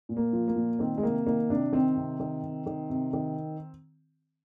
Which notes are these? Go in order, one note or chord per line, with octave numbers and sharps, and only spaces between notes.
A#2
A#3
F3
A#3
A#2
D#3 C4
G#3
C3 A#3
D#3 A#3
C3 D4
D#3 C4
C3
D#3
C3
D#3
C3
D#3